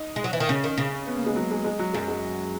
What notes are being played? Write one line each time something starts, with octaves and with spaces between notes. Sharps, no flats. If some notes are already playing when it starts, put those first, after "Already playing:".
Already playing: D#4
G#3
F#3
E3
D#3
C#3 C#4
D#3
C#3
B3
A#3
G#3
F#3
G#3
G#3
F#3
F#2 G#3
G#3